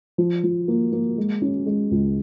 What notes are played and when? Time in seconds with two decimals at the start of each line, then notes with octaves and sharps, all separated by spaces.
0.18 F3
0.44 F3
0.68 A#3
0.92 A#3
1.18 G#3
1.42 C#4
1.66 G#3
1.91 C#2